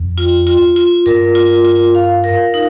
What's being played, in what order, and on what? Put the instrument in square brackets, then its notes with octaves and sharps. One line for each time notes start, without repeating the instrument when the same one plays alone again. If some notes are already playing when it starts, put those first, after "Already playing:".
Already playing: [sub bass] F2
[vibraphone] F4
F4
F4
[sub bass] G2 [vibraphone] A#4
[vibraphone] F4
F4
F5
A#4
D#4